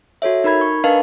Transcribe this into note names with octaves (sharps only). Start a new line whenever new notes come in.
F#4 A4 C#5 E5
D#4 A#4 B5 G#6
C#6
D4 A#4 B4 D#5 F5 A5